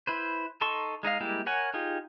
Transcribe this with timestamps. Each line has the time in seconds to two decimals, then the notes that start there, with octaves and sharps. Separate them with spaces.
0.07 E4 B4 C5
0.61 D#4 A4 A5 C6 C#6
1.03 G#3 D#4 D#5 F5
1.20 G3 G#3 A#3 E4 G4
1.46 A#4 C#5 F#5 G#5
1.74 D#4 F4 G4 G#4